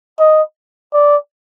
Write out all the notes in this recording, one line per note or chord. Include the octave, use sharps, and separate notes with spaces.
D#5
D5